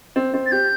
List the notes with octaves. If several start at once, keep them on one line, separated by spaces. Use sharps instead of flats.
C4
C4
A6
G4 G6